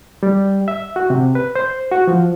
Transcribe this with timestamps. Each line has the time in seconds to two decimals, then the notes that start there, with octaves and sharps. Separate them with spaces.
0.23 G3
0.68 E5
0.96 F#4
1.10 C3
1.35 B4
1.56 C5
1.91 F#4
2.07 F3